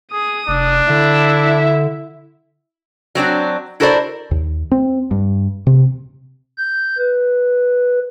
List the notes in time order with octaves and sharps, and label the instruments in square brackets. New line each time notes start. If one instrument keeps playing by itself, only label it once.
[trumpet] G#4 [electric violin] D#6
[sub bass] F1 [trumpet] D4
[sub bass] D3 [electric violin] E4 E5
[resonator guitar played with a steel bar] F#3 C4 D4 F#4
E4 F#4 A4 A#4 C5 D5
[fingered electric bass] D#2
C4
G2
C3
[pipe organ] G6
B4